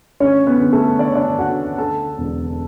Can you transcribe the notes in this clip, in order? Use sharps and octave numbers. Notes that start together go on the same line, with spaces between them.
D2 C#4 C#5
B3 B4
D3
A3 A4
D3 D5
C#5
D4 D5
D2 F#4 F#5
D2 A4 A5
E1